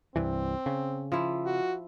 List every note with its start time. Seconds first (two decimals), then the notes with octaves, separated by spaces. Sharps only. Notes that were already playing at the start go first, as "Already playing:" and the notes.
0.16 C2 G2 E3 C4
0.66 C#3
1.12 F3 E4
1.45 F#4